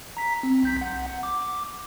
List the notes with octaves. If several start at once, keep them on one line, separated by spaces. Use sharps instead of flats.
A#5 B6
C4
B1 G6 B6
B1 F#5
D6